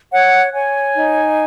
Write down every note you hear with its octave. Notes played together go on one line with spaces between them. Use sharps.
C#5 F#5
C#5 G#5
D#4